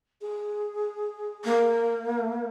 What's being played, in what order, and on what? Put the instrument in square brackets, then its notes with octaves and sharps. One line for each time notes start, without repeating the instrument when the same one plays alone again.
[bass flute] G#4
[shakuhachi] A#3